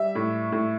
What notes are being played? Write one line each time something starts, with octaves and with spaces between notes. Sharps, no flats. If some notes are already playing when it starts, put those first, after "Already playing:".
Already playing: G3 E5
A2
A2